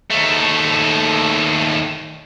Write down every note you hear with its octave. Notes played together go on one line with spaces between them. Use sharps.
D#2 A3